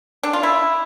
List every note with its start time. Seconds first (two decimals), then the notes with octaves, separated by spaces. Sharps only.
0.23 D4
0.33 F4
0.43 E4